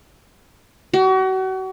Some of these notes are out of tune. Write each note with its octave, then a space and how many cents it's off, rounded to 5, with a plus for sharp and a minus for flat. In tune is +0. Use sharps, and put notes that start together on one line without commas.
F#4 +35